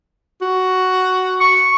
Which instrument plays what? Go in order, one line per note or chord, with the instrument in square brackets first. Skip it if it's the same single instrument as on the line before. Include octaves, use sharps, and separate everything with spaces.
[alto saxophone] F#4
[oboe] C#6